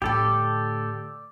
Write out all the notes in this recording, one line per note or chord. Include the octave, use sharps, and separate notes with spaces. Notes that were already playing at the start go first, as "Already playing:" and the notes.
A2 D3 G4 A4 D5 B5